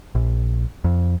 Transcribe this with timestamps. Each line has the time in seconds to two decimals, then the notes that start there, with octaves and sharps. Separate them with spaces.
0.15 A#1
0.84 F2